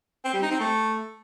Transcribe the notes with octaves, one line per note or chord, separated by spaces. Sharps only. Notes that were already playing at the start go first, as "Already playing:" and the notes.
C4
G3
D#4
C4
A3